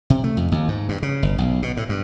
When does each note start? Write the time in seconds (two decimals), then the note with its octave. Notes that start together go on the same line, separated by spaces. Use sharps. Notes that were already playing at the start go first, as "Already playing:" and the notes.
0.10 C3
0.24 A3
0.37 F2
0.52 D#2
0.68 G#2
0.89 G2
1.03 C#3
1.23 G1
1.38 B1
1.62 B2
1.77 A2
1.89 G2